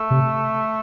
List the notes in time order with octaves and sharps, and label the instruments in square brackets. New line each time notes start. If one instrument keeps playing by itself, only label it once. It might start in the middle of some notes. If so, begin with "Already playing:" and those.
Already playing: [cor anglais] A3
[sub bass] C3